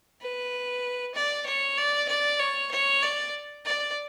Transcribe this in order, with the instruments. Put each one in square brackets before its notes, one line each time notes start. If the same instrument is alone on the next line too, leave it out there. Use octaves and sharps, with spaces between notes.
[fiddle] B4
D5
C#5
D5
D5
C#5
C#5
D5
D5